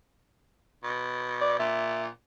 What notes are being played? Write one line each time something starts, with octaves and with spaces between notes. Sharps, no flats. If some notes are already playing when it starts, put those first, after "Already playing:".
B2
D5
A#2 E5